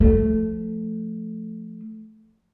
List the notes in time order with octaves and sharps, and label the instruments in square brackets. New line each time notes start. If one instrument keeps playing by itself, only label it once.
[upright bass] F3 A3